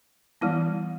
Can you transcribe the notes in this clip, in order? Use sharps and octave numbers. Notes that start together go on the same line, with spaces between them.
E3 G3 B3 E4